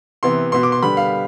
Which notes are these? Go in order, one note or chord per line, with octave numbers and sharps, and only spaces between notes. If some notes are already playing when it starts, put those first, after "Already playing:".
C3 E3 B3 C6
B2 B3 C6
D6
C6
D3 G3 B3 B5
F5